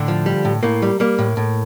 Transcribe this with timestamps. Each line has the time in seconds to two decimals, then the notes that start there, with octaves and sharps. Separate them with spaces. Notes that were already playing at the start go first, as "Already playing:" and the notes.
Already playing: A2 D3 D4
0.08 F3
0.26 G3
0.45 A2
0.63 A2 A#3
0.82 G3
1.00 G3 A#3
1.19 A2
1.37 A2